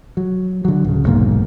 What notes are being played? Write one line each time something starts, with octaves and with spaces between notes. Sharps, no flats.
F#3
D3 F#3
D1 C#3
F1 B1 G#2 A#3